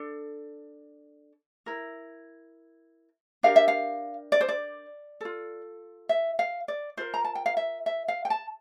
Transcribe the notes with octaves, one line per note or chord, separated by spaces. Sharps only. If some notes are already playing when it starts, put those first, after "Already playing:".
Already playing: D4 A4
E4 A#4
D4 G4 A#4 F5
E5
F5
D5
C5
D5
F4 A4
E5
F5
D5
F4 A#4 C5
A#5
A5
G5
F5
E5
E5
F5
G5
A5